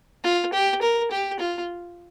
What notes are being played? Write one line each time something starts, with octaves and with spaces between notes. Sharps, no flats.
F4
G4
A#4
G4
F4